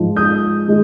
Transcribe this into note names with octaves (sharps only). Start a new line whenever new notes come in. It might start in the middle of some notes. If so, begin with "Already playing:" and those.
Already playing: G#2 F3 G#3
D#6 G6
D#3 G#3